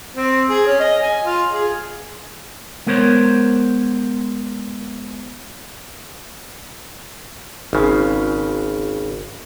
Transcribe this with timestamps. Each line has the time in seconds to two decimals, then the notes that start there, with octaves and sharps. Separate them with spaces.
0.15 C4
0.49 G#4
0.66 C#4
0.79 D#5
1.00 G#5
1.24 F4
1.52 G#4
2.87 G#3 B3 A#4 C5 C#5
7.73 G#1 C#3